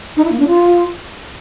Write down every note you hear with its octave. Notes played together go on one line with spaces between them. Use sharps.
D#4
E4
A#3
D4
F4